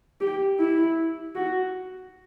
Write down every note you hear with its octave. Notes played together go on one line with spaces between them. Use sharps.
G4
E4
F#4